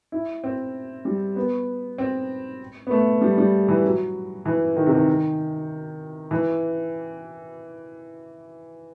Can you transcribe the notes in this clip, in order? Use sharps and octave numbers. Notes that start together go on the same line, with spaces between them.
E4
C4
G3
B3
C4
B3
A3
G3
G3
E3
F#3
E3
D#3
C3
D#3
E3